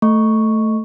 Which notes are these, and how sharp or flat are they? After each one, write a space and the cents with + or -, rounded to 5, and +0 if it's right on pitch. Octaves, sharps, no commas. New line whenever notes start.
A3 +0 C#6 +0